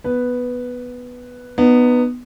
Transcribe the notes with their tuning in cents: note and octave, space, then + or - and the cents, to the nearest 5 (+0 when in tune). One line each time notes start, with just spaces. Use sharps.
B3 +0 B4 +0
B3 +0 D#4 -30